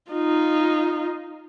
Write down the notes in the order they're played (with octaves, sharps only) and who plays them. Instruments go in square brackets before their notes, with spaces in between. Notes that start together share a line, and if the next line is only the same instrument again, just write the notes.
[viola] D#4 F4